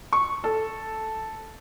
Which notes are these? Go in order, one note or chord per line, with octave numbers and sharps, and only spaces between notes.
C#6
A4